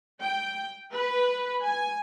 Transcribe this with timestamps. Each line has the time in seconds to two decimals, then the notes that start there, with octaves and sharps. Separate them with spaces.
0.22 G5
0.92 B4
1.62 G#5